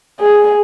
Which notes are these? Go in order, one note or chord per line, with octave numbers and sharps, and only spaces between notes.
G#4